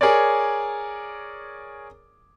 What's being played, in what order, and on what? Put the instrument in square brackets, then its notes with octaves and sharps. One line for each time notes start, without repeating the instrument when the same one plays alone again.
[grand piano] G#4 A#4 C#5 D5